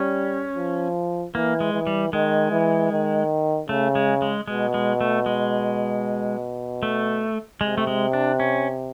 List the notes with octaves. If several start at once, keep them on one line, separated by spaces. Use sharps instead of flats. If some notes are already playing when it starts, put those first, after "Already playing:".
Already playing: G3 C#4
F3
E3 A#3
G#3
E3
G3
D#3 G#3
E3
D#3
C#3 A3
G#3
G#3
B2 G#3
G#3
A3
G#3
A3
C3 G#3
A3
G#3
D4
C#4